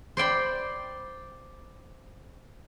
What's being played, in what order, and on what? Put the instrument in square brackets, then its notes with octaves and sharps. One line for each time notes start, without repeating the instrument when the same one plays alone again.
[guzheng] C5 D5 G5 B5